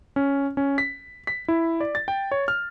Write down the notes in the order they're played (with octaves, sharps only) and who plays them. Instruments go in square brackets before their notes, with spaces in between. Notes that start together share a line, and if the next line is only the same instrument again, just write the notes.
[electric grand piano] C#4
C#4
B6
B6
E4
D5
A6
G5
C#5
F6